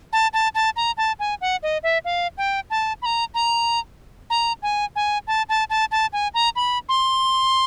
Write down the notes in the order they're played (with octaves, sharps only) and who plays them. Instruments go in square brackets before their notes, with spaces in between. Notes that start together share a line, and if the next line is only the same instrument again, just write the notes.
[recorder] A5
A5
A5
A#5
A5
G#5
F#5
D#5
E5
F5
G5
A5
B5
A#5
A#5
A#5
G#5
G#5
A5
A5
A5
A5
G#5
A#5
B5
C6